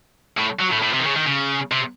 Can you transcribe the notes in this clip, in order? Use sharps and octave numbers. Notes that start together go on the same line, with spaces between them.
A2
F#3
A2
A2
C3
D#3
C#3
D#3
C#3
C3